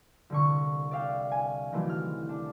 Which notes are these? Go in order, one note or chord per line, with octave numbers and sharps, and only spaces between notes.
C2 D3 C#6
D5 E5 F5 G5
G#5
D#3 E3 F#3 A3 C4 G4
F6
D4